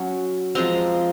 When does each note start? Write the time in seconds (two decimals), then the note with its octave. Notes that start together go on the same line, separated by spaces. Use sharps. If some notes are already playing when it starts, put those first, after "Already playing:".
Already playing: F#3 C#4
0.55 F3 G#3 C4 A#5